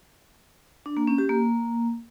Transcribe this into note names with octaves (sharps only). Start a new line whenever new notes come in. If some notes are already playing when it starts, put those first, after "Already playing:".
D4
A#3
C#4
G4
A#3